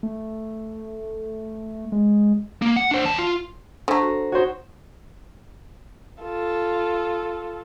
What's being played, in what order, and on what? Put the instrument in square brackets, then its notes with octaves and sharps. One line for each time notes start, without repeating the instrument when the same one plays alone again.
[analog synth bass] A3
G#3
[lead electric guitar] A#3
F#5
D4 C5
E2 A5
F4
[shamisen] D3 A3 [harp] C5 A#5
[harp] F#4
[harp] D#4 C#5 [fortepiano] F#4 C5
[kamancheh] F4 A4